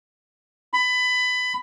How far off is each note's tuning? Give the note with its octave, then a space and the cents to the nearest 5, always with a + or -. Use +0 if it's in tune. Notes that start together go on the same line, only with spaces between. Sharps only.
B5 +20